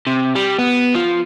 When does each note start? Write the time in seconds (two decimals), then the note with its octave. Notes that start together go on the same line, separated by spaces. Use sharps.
0.07 C3
0.35 G3
0.59 B3
0.95 F3